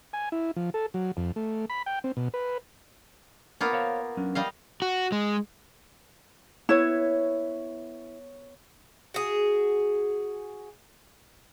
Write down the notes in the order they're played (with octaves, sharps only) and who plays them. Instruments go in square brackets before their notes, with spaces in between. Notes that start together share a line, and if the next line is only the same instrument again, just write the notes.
[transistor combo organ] G#5
E4
F3
A4
F#3
F2
A3
B5
G5
C4
B2
B4
[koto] A#3 B3 F4
[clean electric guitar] C5 C#5 F5
F#3 C#4 D4
[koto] G3 D#5 F5
[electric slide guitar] F#4
G#3
[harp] B3 C#5 [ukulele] E4
[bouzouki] F#4 G#4